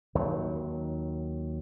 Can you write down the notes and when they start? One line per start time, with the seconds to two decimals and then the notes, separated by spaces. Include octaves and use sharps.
0.15 D#2 D#3 F#3